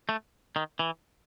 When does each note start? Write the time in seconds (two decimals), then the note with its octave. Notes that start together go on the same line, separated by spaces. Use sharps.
0.09 A3
0.56 D#3
0.79 E3